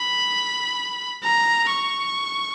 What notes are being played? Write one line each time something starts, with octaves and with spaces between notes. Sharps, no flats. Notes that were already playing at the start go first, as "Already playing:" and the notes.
Already playing: B5
A#5
C#6